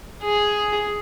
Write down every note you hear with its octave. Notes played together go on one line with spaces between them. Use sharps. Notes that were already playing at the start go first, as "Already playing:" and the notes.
G#4